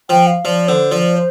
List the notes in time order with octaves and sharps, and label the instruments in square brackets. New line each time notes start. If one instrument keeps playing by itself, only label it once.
[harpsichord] F3 [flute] G5
[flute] F5
[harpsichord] F3 [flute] D5
[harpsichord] D3 [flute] C5
[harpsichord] F3 [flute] D5
[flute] C5